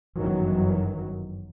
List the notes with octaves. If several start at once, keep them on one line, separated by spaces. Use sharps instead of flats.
G1 F#2 D#3 E3 F#3